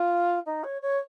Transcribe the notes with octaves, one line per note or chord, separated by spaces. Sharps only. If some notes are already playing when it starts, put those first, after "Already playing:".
Already playing: F4
D#4
C#5
C#5